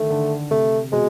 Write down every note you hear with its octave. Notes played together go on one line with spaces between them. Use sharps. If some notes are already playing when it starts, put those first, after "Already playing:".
Already playing: D3 D#3 A3
D3
C3 A3
B2 G#3